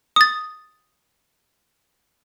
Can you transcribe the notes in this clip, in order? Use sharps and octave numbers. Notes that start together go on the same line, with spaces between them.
D#6 A6